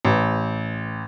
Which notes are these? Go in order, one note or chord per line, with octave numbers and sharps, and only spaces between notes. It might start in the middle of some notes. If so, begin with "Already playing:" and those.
A1